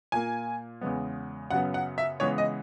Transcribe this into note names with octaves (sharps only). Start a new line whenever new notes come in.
A#2 A#3 G#5
E2 C#3 G#3 B3
F#2 C#3 F#3 B3 F#5
F#5
E5
C#3 E3 G#3 B3 C#5
D#5